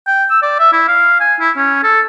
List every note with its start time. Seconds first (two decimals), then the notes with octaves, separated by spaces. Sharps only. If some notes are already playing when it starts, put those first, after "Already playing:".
0.07 G5
0.30 E6
0.42 D5
0.59 E5
0.73 E4
0.88 F5
1.21 G#5
1.40 E4
1.56 C#4
1.84 A4